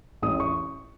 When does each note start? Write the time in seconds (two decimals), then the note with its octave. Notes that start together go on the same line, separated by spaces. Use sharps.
0.22 A1 D#6
0.40 C#6